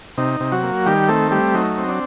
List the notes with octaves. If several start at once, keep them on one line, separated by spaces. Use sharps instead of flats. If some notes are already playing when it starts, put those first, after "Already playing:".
C3 D#4
C3
F#3 F#4
A#3
D#3 G3 G4
A3 C4 A4
G3 A3 G4
F#3 D#4
C4
D4